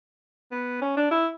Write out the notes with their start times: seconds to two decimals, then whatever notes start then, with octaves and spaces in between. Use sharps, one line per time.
0.52 B3
0.82 C#4
0.97 D4
1.11 E4